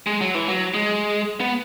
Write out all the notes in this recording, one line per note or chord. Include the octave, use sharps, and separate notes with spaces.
G#3
F#3
E3
F#3
G#3
B3